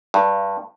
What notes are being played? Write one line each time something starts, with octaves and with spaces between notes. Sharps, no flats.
G2